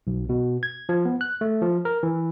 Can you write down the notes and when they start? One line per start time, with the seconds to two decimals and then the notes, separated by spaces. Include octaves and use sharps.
0.07 B1
0.29 B2
0.63 G#6
0.89 F3
1.05 B3
1.21 F#6
1.41 A3
1.61 F3
1.85 A#4
2.03 E3